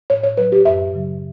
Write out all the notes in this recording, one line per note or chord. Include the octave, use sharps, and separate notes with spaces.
A2 C#5
C#5
F#3 B4
G4
F#2 E5
C#3 F#3